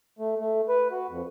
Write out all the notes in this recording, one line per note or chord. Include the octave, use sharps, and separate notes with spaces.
A3
A3
B4
F#4
F2